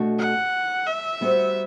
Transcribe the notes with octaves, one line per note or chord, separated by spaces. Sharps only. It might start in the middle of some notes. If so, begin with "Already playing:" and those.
Already playing: B2 A3 D4 F#4
F#5
E5
G3 B3 F#4 C5